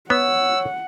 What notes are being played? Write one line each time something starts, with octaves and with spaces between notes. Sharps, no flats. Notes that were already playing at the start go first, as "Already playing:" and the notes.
B3 C#5 F#5 E6